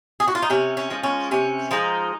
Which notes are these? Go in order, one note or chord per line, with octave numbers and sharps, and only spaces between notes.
G#4
F#4
F4
D#4
C3 C#4
C#4
F3 G#3
C#4
C3 C#4
F3 G#3 D#4